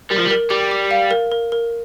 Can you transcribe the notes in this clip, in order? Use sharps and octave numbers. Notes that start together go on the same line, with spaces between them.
G3 A#4
F3
G3
A#4
G3 D6
D6
F5
A#4
A#4
A#4